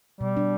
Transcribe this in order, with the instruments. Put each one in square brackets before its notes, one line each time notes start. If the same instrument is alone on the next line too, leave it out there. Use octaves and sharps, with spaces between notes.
[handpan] B2 [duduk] G3
[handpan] D4